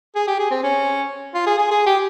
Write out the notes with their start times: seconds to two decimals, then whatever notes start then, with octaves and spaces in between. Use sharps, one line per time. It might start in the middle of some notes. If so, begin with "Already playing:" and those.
0.15 G#4
0.27 G4
0.39 G#4
0.51 C4
0.63 C#4
1.34 F4
1.47 G#4
1.58 G#4
1.71 G#4
1.86 G4